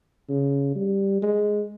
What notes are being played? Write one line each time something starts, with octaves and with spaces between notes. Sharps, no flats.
C#3
G3
G#3